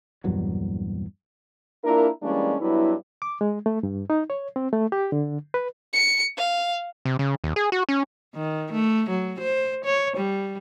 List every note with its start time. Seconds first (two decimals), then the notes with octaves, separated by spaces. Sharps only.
0.24 A#1 E2 G2 F#3
1.84 A#3 D4 E4 F4 A#4
2.23 E3 G3 G#3 A#3 C#4 D4
2.60 G2 F#3 B3 E4
3.22 D6
3.41 G#3
3.66 A3
3.83 G2
4.10 D#4
4.30 C#5
4.56 C4
4.73 A3
4.92 G4
5.12 D3
5.54 B4
5.93 C#7
6.37 F5
7.05 C3
7.19 C#3
7.44 D#2
7.56 G#4
7.72 F#4
7.89 C#4
8.35 D#3
8.73 A3
9.10 F#3
9.40 C5
9.85 C#5
10.17 G3